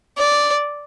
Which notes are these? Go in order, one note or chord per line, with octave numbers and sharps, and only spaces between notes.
D5